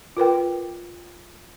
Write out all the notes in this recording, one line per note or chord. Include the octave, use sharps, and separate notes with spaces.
F4 A#4 B4 G5